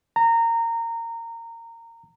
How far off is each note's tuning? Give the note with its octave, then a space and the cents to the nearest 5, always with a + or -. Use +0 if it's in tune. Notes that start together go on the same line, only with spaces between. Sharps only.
A#5 -20